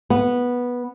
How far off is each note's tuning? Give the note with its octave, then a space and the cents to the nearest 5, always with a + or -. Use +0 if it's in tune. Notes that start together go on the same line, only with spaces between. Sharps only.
B3 -10